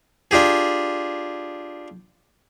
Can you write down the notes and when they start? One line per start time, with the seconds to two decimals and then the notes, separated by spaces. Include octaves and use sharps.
0.31 D4 F4 G4 G#4